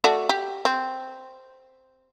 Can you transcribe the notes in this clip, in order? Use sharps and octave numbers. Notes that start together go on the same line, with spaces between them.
A3 F#4 D5
G4
C4